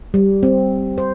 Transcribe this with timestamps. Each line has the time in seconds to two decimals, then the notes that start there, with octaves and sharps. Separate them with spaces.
0.14 G3
0.43 C4
0.98 C5